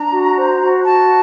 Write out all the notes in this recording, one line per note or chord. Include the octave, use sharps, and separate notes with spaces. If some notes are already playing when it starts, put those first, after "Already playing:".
Already playing: D4 A#5
F#4
C5
F#4
F#4 A5